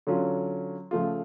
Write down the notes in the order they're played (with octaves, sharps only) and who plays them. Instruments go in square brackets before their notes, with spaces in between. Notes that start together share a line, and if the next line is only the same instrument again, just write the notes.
[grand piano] D3 F#3 C#4 F4
C#3 F3 A3 F4